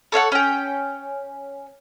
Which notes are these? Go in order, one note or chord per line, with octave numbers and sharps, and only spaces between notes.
A4 C#5 F5 F#5
C#4 G5